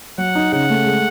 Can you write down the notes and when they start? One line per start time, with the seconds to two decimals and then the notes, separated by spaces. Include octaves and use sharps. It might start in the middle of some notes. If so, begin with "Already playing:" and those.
0.18 F#3 F#5
0.35 D#4
0.52 C#3 F#5
0.70 A3
0.86 G#3